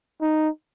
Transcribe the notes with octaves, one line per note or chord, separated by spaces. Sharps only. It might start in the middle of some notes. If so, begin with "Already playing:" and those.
D#4